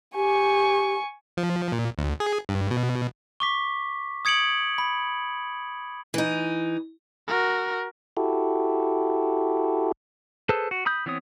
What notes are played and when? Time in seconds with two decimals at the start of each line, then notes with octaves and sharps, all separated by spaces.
0.15 G4 G#5 C#6
1.37 F3
1.72 A#2
1.98 D2
2.20 G#4
2.49 G2
2.71 B2
3.40 C#6 D6 B6
4.25 D#6 G#6 C#7 D7 F#7
4.78 B5
6.14 E3 D#4
7.28 F#4 A#4
8.17 E4 F#4 G4 A4
10.49 G#4 A4 B4 C5 A5
10.71 F#4
10.86 B5 D#6 G6
11.06 E3 B3 C4 C#5 D#6